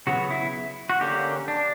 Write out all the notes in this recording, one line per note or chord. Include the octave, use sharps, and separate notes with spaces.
C#3 F#3 B3 F#4
E4
F#4
D3 A#3 C#4 G4
D4